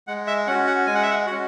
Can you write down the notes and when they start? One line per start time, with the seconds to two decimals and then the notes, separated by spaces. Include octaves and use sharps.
0.07 G#3 F#5
0.27 E5
0.47 C#4 F#4 F#5
0.67 F#5
0.86 G#3 G#5
0.95 F#5
1.03 E5
1.10 F#5
1.27 C#4 F#4 F#5